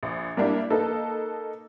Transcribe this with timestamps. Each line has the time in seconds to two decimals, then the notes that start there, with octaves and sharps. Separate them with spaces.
0.03 A#1
0.37 G3 A#3 D4 E4
0.70 A#3 D#4 A4 B4